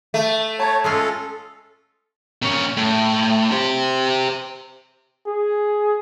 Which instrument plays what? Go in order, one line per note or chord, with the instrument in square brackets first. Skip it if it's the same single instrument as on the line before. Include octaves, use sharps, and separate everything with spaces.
[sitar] A3 [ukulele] A4 E5
[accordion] C#5 [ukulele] A5 A#5
[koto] G#3 C#4 F4 [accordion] A4
[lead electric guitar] A#2 C#4
A2
G4 C5
[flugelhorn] G#4